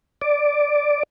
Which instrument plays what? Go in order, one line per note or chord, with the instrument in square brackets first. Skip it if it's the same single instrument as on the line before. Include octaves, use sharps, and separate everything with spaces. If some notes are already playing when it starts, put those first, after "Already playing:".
[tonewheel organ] D5